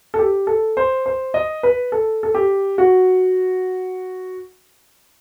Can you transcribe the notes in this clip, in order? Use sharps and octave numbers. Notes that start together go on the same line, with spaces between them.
A4
G4
A4
C5
C5
D#5
B4
A4
A4
G4
F#4